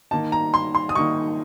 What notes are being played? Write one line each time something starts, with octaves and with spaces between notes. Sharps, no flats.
D#3 A#3 D#4 A5
A#5
C6
C6
D#6
D#3 A#3 D#4 C#6